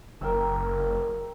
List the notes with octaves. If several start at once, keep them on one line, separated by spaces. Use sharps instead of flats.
F#1 A#4 G5 E6